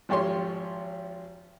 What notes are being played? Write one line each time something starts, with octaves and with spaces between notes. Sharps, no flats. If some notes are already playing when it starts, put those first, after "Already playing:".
G#1 F3 G4 C#5 C6